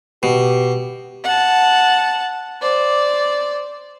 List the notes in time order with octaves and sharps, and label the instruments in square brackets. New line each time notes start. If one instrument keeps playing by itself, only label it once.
[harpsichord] B2 [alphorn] G4
[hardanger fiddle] F#5 A5
C5 D5